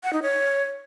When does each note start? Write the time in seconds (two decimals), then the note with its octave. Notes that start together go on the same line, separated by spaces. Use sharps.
0.04 F#5
0.13 D#4
0.22 C#5